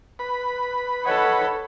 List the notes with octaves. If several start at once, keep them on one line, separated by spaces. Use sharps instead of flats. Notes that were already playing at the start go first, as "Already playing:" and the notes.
B4 B5
A4 C#5 D#5 F#5